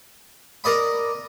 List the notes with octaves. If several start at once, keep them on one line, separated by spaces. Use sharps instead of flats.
A#4 D5 D#5 B5